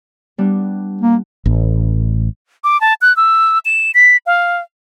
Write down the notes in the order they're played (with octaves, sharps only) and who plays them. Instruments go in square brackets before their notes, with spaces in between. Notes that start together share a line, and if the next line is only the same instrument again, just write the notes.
[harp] G3 B3 D4
[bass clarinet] A#3
[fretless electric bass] A1
[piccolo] D6
A5
F#6
E6
E7
B6
F5